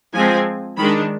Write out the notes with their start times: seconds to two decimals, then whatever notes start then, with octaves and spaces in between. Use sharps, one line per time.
0.13 F3 G#3 C4 G#5
0.77 D#3 G#3 D4 B5